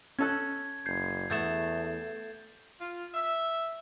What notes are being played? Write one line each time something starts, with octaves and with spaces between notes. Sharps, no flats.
C#4 A4 F#6 G#6
F#1 G6 G#6 C7
E2 A3 B3 G6 A6 E7
F4
E5